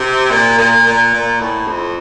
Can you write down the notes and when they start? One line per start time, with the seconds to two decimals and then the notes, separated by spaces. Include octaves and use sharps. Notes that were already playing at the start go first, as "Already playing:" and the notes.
Already playing: C3
0.31 A#2
0.58 A#2
0.86 A#2
1.14 A#2
1.41 A2
1.67 F2